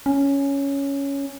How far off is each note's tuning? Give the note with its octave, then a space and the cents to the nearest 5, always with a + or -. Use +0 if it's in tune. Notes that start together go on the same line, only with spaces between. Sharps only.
C#4 +5